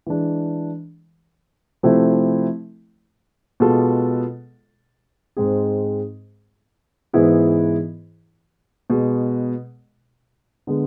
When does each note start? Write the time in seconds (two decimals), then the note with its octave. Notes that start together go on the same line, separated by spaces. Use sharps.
0.07 E3 G#3 D4
1.83 C3 F3 A3 C4 E4
3.60 B2 G#3 B3 F4 A4
5.37 G#2 G#3 C4 G#4
7.13 G#2 E3 B3 E4 G#4
8.90 B2 G#3 B3
10.67 D3 G#3 B3